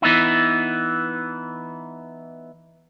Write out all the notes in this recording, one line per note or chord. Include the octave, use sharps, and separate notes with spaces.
E3 B3 D#4 E4